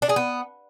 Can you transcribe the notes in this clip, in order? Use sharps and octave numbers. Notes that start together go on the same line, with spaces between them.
D4
G#4
B3